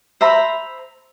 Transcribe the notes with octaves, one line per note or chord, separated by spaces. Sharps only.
C5 E5 A#5 B5